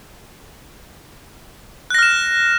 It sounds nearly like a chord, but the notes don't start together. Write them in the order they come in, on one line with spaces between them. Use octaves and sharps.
F#6 A#6 F6 E7